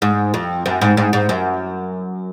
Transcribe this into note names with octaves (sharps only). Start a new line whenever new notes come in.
G#2
F2
F#2
G#2
G#2
G#2
F#2